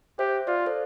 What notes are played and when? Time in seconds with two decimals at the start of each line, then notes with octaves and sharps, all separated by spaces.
0.19 G4 C5 E5
0.47 F4 D5 F5
0.66 A4 C5